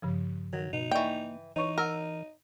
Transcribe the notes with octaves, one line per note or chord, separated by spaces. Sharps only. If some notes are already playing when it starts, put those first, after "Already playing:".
G2 C#3 F3
D#3 F#3
B2 D#4
E3 A#3 D5 D#5 G5 C#6
E3 D#4 C#5 C#6
A#4 F#5 E6 F6